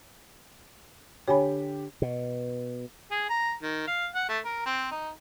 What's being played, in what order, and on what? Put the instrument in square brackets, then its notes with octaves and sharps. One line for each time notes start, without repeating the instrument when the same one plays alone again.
[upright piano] D3 G4 [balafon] C#5 G#5 B5
[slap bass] B2
[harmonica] G#4
A#5
D#3
F5
F#5
A3
A#4
C4
D#4